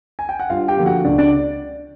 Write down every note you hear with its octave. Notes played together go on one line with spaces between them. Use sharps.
G#5
G5
F#5
G2 F4 F5
G4 G5
D3 F3 A#3
F#4 F#5
C#2 D4 D5
D4 D5